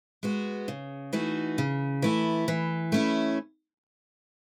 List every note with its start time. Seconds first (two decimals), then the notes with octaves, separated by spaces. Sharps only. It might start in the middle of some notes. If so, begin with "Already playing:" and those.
0.23 G#3 B3 F#4
0.68 C#3
1.13 E3 A3 D#4 F#4
1.58 C#3
2.02 E3 A3 E4
2.48 E3
2.92 A3 C#4 E4